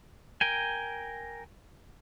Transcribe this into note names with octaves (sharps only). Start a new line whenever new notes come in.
A#4 G5 G#5